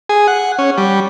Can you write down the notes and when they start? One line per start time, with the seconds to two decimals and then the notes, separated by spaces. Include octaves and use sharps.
0.09 G#4
0.27 F#5
0.59 C#4
0.78 G3